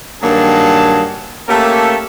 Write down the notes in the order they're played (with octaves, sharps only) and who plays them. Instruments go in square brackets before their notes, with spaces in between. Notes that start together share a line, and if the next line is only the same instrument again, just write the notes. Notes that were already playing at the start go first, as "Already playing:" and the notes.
[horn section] G2 D#3 F#3 A#3 G#4 A5
A3 A#3 C#4 G4 A4